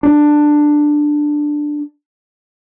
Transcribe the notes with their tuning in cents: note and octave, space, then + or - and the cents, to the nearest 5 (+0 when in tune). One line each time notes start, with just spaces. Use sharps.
D4 +10